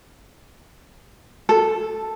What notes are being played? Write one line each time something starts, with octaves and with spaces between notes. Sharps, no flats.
A4